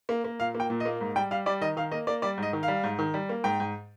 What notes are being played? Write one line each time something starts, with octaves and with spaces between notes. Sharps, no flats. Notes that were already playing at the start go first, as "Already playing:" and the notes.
A#3
A#3
A#2 F5
A#3
G5
A#2
D#5
A#3
G#2
G3 G5
G3 F5
G3 D5
D#3 D#5
D#3 F5
A#3 D#5
A#3 D5
G3 D5
G#2 D#5
D#3
F5
G3
G#2
D#3
G3
A#3
G#2 G5
G#2